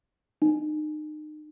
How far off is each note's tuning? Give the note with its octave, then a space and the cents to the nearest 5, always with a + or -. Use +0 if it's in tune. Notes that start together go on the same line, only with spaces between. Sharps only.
D#4 -35